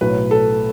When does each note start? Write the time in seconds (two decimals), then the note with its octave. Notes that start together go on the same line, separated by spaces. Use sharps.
0.01 B1 A2 F#3 B4
0.31 A4